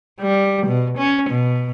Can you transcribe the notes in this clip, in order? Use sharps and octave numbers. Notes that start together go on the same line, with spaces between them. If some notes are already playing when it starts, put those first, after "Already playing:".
G3
B2
C#4
B2